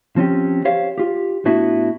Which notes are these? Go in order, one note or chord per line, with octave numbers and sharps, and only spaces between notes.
F3 C4 C#4 G4
G4 C5 C#5 F5
F4 G4
A2 B3 D4 E4 F#4